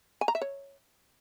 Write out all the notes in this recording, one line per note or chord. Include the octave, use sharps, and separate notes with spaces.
G#5
A#5
E5
C#5